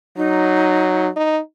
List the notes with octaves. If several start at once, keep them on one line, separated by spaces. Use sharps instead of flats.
F#3 D#4
D#4